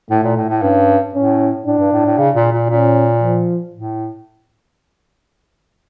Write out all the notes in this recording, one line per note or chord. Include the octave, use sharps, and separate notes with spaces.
A2 A3
A#2
A2
A2
G2 C#4
A2 C#4
A2 D4
G2
A2
A2
C#3
A#2
A#2
A#2 C#4
F3
A2